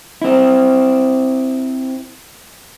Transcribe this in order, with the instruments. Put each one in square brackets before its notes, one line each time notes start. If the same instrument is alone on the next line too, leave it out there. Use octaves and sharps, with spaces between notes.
[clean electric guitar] C4 E4